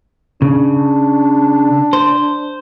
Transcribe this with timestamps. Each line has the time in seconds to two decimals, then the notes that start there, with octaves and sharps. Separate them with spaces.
0.42 C#3 D4
1.93 C5